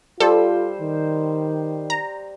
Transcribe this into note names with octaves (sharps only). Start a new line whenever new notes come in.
G3 F4 A4 C5 E6
D#3
A#5